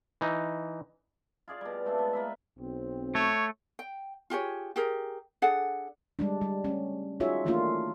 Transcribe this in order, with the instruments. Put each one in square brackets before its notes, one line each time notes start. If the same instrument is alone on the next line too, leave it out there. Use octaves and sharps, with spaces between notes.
[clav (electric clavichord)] E3 D#4
[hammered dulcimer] F4 G#4 D5 F5
B2 G3
G#3 A3 C4 D4
B3
A#3 B4 E5
[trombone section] B1 C4
[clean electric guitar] A3 [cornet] C#5
[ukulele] G5
F4 G4 G#4 C#5
G4 G#4 A#4
D4 G#4 A4 F#5
[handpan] G3 G#3 D4
G3
A3 C#4
D#4 F4 F#4 G#4 C#5 E5
D#3 E3 A3 A#3 D4 F4